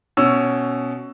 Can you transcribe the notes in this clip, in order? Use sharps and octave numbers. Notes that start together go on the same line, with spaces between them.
B2 C#4 E6